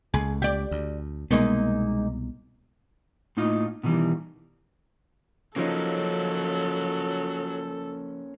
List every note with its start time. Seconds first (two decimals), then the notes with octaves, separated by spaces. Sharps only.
0.14 C#2 G#4
0.42 G4 D5
0.71 D2
1.31 C2 B2 G#3 A#3 B3 D#4
3.37 A2 A#3 D#4 F4 D#5
3.83 B2 D#3 E3 G3
5.56 C#3 F3 F#3 A#3 C#4 D#4 A4